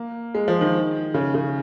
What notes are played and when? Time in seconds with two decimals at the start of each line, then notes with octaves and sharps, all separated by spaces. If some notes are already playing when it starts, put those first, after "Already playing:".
Already playing: A#3
0.35 G#3
0.48 F3
0.61 D#3
1.14 C#3
1.34 C#3